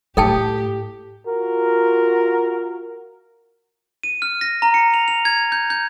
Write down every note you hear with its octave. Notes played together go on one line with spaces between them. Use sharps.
A2 G4 A4 G5 A5
F4 F#4 A#4
D#7
F6
A#6
A#5
C#7
F7
F7
G#6
G6
G6